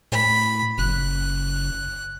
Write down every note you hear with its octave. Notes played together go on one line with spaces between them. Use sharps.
A2 B5
F#1 F#6